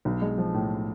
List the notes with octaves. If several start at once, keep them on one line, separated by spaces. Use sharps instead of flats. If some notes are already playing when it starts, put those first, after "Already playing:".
B1
G#3
F3
A2